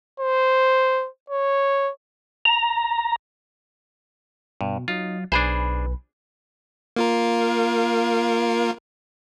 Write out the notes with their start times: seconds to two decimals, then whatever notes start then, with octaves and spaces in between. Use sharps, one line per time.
0.20 C5
1.30 C#5
2.45 A#5
4.61 G2 B2
4.88 F#3 D#4 F4
5.32 B1 D4 G#4 B4 C5 G#5 B5
6.96 A#3 F4 A#4